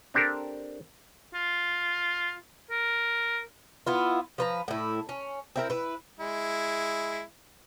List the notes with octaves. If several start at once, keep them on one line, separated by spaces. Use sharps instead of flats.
C4 D4 G4 A4 A#4
F4
A#4
B3 E4 F4
F3 B4 A#5
A2 E4
C#4
C4 E4 A#4
E4 B4
G#3 E4